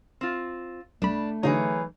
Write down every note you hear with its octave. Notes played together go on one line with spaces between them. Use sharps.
C4 F4
C2 A3 D4 B5
D3 E3 F#3 D#4 G#4 C#5